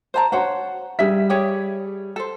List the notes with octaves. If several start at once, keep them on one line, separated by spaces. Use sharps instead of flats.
C5 A5 A#5
F#4 C5 C#5 F#5
G3 G#4 E5 B6
G4 G#4 C#5
A4 C5